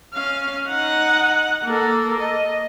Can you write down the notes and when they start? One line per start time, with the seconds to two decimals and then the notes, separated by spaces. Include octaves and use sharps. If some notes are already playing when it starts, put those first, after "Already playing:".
0.14 C#4 F5
0.68 D#4 F#5
1.65 A#3 A4
2.20 D#5